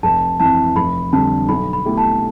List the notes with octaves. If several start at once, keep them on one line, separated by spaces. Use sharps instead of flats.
F1 A5
F2 E3 A5
F1 B5
F2 D3 G3 A5
B1 B5
B5
B2 A3 E4 G4
A5